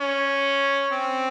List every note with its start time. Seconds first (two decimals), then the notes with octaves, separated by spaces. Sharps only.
0.01 C#4
0.92 C4